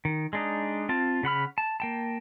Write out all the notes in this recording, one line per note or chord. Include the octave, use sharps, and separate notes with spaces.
D#3
G#3 D4 D#4
C4 F4 A5
C#3 F#5 B5 F6
A5
A#3 G5 A5